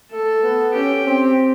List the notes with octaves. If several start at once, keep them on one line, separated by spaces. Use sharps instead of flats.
A3 A4
B3
C#4 G4
C4